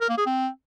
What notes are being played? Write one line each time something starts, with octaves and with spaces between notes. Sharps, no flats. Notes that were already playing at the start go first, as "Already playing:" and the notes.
A#4
A#3
G#4
C4